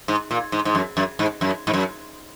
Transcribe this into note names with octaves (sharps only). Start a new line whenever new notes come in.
G#2
A#2
G#2
G#2
F#2
F#2
G#2
F#2
G#2
F#2